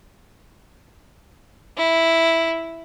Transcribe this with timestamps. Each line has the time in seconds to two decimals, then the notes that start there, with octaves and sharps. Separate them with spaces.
1.77 E4